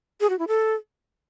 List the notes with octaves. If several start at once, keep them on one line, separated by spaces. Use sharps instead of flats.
G#4
F#4
E4
A4